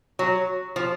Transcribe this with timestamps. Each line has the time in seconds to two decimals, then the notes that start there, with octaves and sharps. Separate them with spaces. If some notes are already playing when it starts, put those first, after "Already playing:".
0.19 F#3
0.76 F3